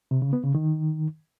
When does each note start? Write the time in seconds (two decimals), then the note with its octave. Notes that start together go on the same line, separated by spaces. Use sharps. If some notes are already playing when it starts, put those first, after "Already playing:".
0.11 C3
0.22 C#3
0.33 B3
0.44 C#3
0.55 D#3